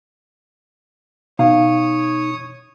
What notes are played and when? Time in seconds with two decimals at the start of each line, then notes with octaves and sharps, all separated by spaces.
1.39 B2 D#4 C#5 F5 D#6